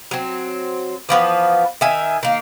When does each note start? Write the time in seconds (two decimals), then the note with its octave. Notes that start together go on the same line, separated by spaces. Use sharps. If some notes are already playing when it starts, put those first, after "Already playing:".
0.11 F#3 C4
1.09 E3 F3 B3 B4
1.81 D#3 E5 G#5
2.23 D#3 A#3